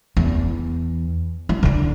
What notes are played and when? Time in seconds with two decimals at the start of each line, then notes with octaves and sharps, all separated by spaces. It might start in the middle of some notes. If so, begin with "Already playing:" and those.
0.17 E2
1.49 F#3
1.63 D3 D4